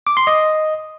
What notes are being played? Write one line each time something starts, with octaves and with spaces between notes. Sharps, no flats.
D6
C6
D#5